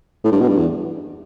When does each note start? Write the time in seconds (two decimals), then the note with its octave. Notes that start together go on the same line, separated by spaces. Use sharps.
0.25 A2
0.32 G2
0.41 B2
0.49 G2
0.58 E2